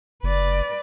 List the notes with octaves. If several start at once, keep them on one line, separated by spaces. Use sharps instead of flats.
F#1 B4 D5